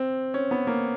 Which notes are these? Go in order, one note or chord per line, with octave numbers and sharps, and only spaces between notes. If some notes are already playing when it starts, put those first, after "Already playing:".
Already playing: C4
C#4
B3
A#3